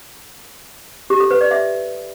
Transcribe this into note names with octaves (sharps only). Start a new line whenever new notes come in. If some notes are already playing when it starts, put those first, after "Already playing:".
G4
A4
B4
D5
E5